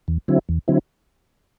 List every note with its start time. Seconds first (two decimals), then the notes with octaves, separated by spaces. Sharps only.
0.08 E2
0.28 D3 F#3 C4 E4
0.49 E2
0.68 D3 F#3 C4 E4